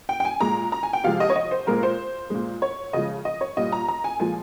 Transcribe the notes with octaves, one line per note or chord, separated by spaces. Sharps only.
G5
G5
G#5
A#2 G#3 A#5
A#5
G#5
G5
C3 F3 G#3 F5
D#5
C#5
D#5
C5
A#2 G#3 A#4
C5
A#2 G#3
C#5
C#3 F3 G#3 D#5
D#5
C#5
A#2 G3 D#5
A#5
A#5
G#5
A#2 F3 G#3 G#5